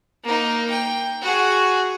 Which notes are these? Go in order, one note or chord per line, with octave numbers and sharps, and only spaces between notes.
A#3 D#4
G5
F#4 G#4